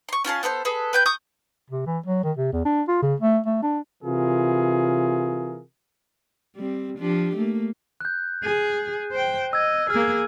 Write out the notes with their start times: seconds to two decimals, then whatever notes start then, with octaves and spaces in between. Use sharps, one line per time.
0.09 C6 C#6
0.24 C#4 F4 G#4 A5
0.43 B3 A4 B4 C5
0.65 G#4 A4 B4
0.93 B4 G5 G6
1.06 C#6 D#6 G6
1.70 C3
1.86 E3
2.06 F#3
2.24 D#3
2.37 C3
2.53 E2
2.65 D4
2.88 F4
3.02 C#3
3.20 A3
3.46 A3
3.63 D4
4.03 C3 E3 F4 G#4 A#4
6.56 G3 C4
6.98 F3 D4 G4
7.37 A3 A#3
8.01 F#6 G6
8.43 G#4
9.12 C5 G5
9.53 D#5 E6 G#6
9.90 A#3 G#4 F6